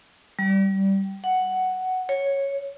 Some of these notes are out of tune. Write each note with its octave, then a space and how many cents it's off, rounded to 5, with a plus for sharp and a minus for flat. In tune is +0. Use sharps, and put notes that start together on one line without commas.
G3 -15
F#5 +5
C#5 -5